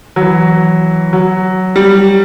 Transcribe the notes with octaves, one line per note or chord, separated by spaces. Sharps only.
F#3
E3
F#3
G3